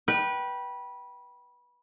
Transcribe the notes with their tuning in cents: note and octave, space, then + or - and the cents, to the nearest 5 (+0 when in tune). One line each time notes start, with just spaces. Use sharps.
B4 -20 G5 -15